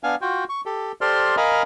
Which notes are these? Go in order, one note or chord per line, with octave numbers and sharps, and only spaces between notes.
B3 D4 F5 G#5
F4 F#4 G5
C#6
G4 A4
G4 A4 C5 D5 C6 F6
A#4 D#5 F5 G#5 A#5 B5